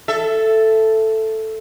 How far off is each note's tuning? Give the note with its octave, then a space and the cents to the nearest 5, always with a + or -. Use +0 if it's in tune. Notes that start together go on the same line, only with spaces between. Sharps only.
A4 +0 E5 +15